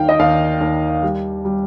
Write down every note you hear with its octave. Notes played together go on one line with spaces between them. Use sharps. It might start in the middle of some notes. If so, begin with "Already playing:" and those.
Already playing: D#2 D#3 F5 G5
D#5
D#2 F5
D#2
G3 G4
G3